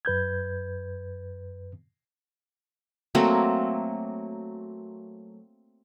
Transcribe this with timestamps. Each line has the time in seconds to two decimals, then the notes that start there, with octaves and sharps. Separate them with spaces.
0.05 F#2 B4 G6 G#6
3.15 F#3 A3 A#3 C4